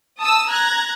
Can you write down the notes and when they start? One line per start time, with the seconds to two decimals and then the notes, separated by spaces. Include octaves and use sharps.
0.19 A5 D#6 E6
0.48 A#5 F#6 G#6